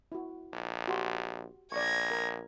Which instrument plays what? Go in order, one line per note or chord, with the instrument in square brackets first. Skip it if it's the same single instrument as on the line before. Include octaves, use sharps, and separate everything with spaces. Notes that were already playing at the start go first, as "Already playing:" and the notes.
[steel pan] E4 F#4
[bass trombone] A#1
[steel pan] F#4 G4 C6
[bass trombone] A#1 [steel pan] D5 C#6 [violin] G#6 A#6
[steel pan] A#4 A#5